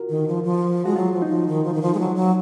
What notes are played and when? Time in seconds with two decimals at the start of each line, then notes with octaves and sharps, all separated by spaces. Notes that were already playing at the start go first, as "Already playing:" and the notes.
Already playing: F4 F#4 A#4
0.09 D#3
0.28 F3
0.44 F3
0.86 G#3 F#4
0.96 F#3 F4
1.13 F3
1.22 F#3 D#4
1.30 F3
1.48 D#3
1.64 F3
1.74 D#3
1.82 F3
1.94 G#3
1.99 F#3
2.16 F#3